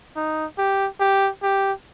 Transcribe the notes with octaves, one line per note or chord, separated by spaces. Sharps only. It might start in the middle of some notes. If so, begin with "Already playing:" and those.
D#4
G4
G4
G4